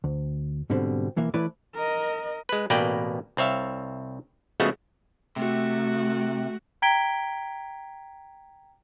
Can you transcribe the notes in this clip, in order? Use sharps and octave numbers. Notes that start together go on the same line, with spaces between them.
D2
G#2 B2 D3 G3 C4
B1 E3 A#3 E5
E3 A3 E4 B4 C#5 D5
A#4 D#5
G#3 B4
A1 B2 A#3 B4 D5 G5
C2 C4 C#5 E5 F5
C#3 F3 G#3 A3 B3 F#4
C3 A3 F#4
G5 A#5 G#6 B6 D7 G7